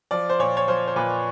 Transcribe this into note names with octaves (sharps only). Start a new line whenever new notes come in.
F3 D5
C5
A#2 C#5
C#5
F3 C5
C5
A#2 B4